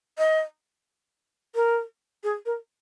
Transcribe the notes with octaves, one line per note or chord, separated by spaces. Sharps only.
D#5
A#4
G#4
A#4